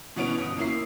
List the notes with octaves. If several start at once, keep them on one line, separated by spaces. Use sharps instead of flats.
B2 E3 B3 C#4 D7 F7
G1 D#6
A#3 C#4 E4 C7